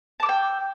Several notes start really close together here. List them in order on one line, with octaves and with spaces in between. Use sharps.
A5 D6 E6 G5